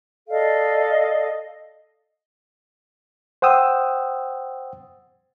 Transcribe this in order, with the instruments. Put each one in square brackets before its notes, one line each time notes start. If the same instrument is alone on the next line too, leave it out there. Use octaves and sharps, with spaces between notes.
[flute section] A4 D5 D#5 F5
[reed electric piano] C5 F#5 G5 D#6 E6